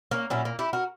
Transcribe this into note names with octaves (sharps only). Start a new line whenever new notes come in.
A#3 C#4
A#2 F#3 C#4 E4
A#3
E4 G4
F#4 A#4